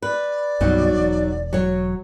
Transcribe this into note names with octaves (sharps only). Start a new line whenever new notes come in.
B4 D5
C2 G2 B2 F#3 D#4 F#4
E1
F#3 C#5